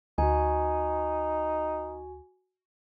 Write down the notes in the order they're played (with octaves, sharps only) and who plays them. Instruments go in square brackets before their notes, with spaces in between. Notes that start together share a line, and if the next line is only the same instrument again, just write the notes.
[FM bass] D2 [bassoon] D#4 [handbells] F#4 G#5